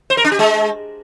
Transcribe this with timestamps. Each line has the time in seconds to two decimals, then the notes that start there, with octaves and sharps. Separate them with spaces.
0.10 C5
0.17 A#4
0.24 D4
0.32 G4
0.39 G#3